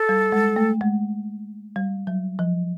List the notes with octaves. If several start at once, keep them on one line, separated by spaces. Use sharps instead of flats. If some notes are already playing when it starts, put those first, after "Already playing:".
Already playing: A4
G3
G#3
A3
G#3
G3
F#3
F3